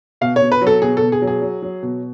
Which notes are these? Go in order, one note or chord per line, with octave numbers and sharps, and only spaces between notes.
B2 F5
C#5
B2
B4
F#3
A4
B2 G#4
A4
B2
G#4
F#3
G#4
F#3
F#3
B2